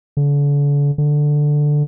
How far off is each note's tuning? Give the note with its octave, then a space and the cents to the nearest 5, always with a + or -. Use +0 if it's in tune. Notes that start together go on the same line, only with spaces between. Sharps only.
D3 -40
D3 +5